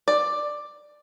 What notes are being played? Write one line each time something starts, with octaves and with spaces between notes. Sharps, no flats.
D5